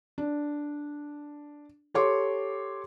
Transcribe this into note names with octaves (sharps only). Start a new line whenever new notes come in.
D4
G4 A4 C#5 C6 D6